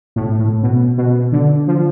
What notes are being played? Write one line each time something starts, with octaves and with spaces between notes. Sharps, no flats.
A2
A2
B2
B2
D3
F3